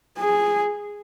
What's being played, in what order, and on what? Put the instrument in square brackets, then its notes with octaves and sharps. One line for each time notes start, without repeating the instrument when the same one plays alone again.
[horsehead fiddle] G#4